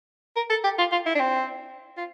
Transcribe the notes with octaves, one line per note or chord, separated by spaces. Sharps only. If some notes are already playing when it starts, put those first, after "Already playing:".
A#4
A4
G4
F4
F4
E4
D4
C4
F4